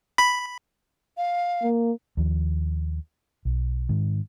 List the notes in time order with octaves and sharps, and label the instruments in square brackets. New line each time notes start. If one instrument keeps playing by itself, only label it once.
[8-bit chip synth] B5
[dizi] F5
[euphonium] A#3
[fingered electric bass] D#2 F3
B1
G#2 D#3